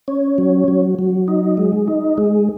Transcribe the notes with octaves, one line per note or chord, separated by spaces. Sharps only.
C#4
F#3
F#3
F#3
D#4
G#3
D#4
G#3